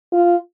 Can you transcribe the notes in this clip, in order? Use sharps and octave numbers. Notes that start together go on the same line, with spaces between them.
F4